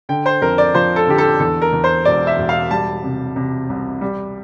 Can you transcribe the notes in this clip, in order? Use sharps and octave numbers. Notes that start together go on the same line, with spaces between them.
D3 G5
C5
F2 A#4
D5
F3 C5
A4
D3 G4
A4
E2 A4
A#4
E2
C5
E1 D5
E5
E1
F5
G3 A5
C3
C3
C2
G3